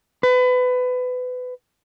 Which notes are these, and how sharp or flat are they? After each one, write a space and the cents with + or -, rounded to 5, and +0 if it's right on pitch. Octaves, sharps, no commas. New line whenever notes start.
B4 +25